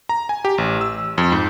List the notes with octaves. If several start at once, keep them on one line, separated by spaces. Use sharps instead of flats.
A#5
G#5
G4
A1
E6
F2
G#2